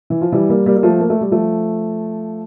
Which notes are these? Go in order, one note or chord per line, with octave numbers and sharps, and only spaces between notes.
E3
F3
E3 G3
G3 A#3
G3 A#3
G3
F3 A3
A#3
A3
G3
F3 A3